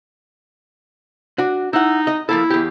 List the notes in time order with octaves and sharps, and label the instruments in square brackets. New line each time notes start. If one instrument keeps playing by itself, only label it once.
[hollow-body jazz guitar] D4 F#4
[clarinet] D#4 [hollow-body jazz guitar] E4 F#5
[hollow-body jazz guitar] D#5
[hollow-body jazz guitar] F3 A#3 A4 [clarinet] E4
[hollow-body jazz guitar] E2 G4